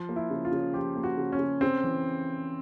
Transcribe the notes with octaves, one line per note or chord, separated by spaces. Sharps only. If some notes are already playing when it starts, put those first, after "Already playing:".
Already playing: F3
A#3
E4
C#3
F4
C#3
F3 G4
A#3
F#4
C#3
C#4
C#3
C#3 C4
E3